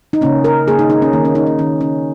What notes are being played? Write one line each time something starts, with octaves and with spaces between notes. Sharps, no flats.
D#4
C#3 A#3 C#4
A#4
C#3 A#3 G#4
D#4
D#4
C#4
D#3 A#3
C#4
D#4
C#4
D#3 A#3 C#4
C#4